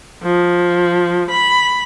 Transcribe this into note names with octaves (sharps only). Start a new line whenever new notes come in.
F3
B5